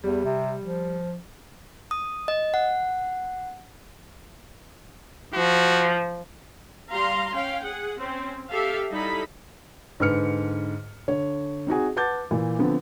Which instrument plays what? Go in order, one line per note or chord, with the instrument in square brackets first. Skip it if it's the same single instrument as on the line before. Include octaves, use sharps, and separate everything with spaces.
[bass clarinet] E2 [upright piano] G3
[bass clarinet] C3
F3
[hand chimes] D#6
D#5
F#5
[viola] F3 [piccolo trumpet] F#4
[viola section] G3 F5 A#5 C6
C#4 F5 G5
G#4 F#5
C4 C#4
G4 A4 E5 F5
G3 D#4 E4 A4 B5
[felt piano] G#2 D3 B4 F6 C#7
D3 C#5
C4 D#4 F#4 G#4
B4 F#5 A5 D6 G6 A6
A#2 E3
D3 F3 B3 C4